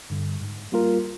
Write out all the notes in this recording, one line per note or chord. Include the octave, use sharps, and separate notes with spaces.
G2 D3 G3
G#2
G3 A#3 F4 A#4